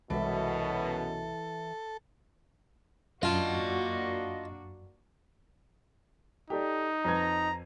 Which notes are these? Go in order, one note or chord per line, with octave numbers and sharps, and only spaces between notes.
C2 F#2 B2 E3 G#3 A4 E5
F#2 A#3 D4 F4 F#4 D#5 A5
D#4 G4 A4 D5
F2 B4 A#5 G#6